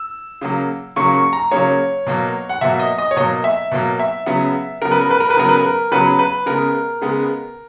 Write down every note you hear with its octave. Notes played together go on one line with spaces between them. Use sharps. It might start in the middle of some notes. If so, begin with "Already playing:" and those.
Already playing: E6
C#3 F#3 A#3
C#3 F#3 A#3 C#6
C#6
A#5
C#3 F#3 A#3 C#5
B2 F#3 A#3
F#5
B2 F#3 A#3 E5
D#5
D#5
C#5
B2 F#3 A#3 D#5
E5
B2 F#3 A#3
E5
C#3 F#3 B3
C#3 F#3 B3 A#4
B4
A#4
B4
A#4
B4
C#3 F#3 B3 A#4
B4
A#4
C#3 F#3 B3 B4
B4
C#3 G#3 B3 A#4
C#3 G#3 B3